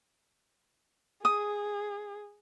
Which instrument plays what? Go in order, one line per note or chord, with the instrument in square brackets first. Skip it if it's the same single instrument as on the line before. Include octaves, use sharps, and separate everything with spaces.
[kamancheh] G#4 [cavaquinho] D#6